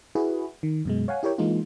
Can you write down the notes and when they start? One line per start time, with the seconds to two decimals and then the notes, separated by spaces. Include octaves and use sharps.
0.15 E4 F#4 G#4 B4
0.63 D#3
0.85 F#2 B2 G#3
1.08 C#5 F5 F#5 G#5
1.23 E4 G4 A#4 C#5 G5
1.38 E3 G#3 A#3 D#4 F4